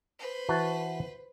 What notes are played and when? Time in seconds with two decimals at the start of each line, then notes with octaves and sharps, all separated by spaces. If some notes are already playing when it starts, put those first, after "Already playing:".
0.19 B4 C5
0.49 E3 F#4 A5